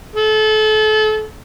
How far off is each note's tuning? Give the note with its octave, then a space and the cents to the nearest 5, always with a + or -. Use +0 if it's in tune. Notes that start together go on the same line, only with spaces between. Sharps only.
A4 -30